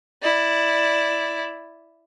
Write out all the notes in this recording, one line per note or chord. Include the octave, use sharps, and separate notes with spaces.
E4 D5